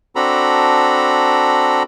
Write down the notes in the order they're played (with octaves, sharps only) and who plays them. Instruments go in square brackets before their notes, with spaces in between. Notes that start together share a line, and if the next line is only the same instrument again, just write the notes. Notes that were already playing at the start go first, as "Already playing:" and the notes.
[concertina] C4 D4 F#4 A4 A#5 B5